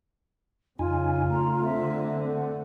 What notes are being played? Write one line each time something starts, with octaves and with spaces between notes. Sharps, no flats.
F2 C#3 D#4 F4 G#5
A3 A#5
D3 C4 E5
A3 F#5